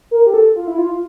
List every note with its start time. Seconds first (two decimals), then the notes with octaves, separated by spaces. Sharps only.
0.11 A#4
0.27 G4
0.34 A4
0.56 F4
0.67 E4
0.78 F4